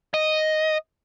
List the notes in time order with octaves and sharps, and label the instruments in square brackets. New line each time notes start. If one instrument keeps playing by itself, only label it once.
[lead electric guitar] D#5